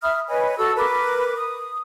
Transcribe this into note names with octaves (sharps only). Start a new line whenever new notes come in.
E5 B5 D#6 F6
B4 C#5 D#5 G#5
F#4 A4 E6
A#4 B4 D6
D#6